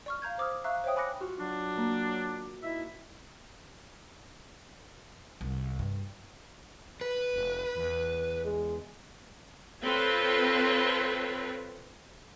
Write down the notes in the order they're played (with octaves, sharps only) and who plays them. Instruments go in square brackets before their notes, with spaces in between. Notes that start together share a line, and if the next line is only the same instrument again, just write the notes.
[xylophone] D5 C#6 F6
F5 A#5 G6 G#6
C5 D6 D#6 F6
E5 F5 A#5 C#6 E6 F#6
C5 C#5 E5 G5 D#6
G#5 B5 D6 F#6 A#6 C#7
[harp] F4 F#4
[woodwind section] F#3 D4
[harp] A#3
[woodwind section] D#4 E4 E5
[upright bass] C2
G2
[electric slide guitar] B4
[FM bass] F1
E2
[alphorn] G#3
[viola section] C4 F4 A4 B4 C#5